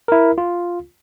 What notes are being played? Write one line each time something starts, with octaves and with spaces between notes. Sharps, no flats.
E4 A#4
F4